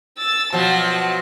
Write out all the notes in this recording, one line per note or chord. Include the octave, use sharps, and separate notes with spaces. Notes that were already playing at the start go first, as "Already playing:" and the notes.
E6 A6
B2 F3 F#3 A5